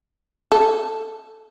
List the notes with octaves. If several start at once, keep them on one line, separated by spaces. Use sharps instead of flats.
A4